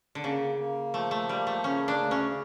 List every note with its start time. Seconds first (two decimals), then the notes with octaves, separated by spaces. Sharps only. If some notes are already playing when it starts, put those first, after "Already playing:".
0.15 D3
0.24 C#3 A#3
0.59 A#3
0.94 F3 A3
1.11 A3
1.29 G3 A#3
1.47 A3
1.64 C#3 C#4
1.88 D4
2.00 D2
2.11 C#4